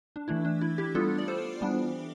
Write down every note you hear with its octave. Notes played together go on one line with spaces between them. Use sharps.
D4
E3 A3 D4 E4
D4
E4
E4 G4
G3 B3 D4 F4 A4
D5
A4 C5
E3 G3 B3 D4